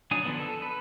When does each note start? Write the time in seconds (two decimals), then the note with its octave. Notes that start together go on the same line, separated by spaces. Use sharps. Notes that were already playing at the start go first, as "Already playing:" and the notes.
0.11 F#3 D4 D#4 G#5 D#6
0.24 D3 F3 A3 B3 D4
0.39 A4
0.62 B4